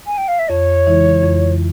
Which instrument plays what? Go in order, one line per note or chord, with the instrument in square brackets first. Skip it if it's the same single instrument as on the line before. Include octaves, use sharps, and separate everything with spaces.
[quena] G#5
G5
F5
E5
[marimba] F2 [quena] C#5
[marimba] C#3 E3 G#3 E4
F2